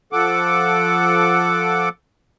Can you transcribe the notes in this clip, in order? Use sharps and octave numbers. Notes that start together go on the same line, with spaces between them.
F3 A4 F#5 D6